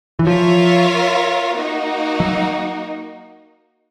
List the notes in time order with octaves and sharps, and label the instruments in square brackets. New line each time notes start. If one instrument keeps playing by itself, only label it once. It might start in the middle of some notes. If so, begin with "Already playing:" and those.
[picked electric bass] E3
[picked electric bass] F3 [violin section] F4 A#4 C#5 E5
[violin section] A#3 D#4 F#4
[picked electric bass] F#3